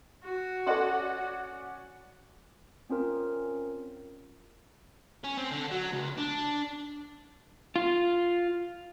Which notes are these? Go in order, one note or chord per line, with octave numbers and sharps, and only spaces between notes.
F#4
C#4 A4 D5 D#5 F#5 C6
C4 C#4 F4 A#4
C#4
C4
D3
F#3
C#2
D4
F4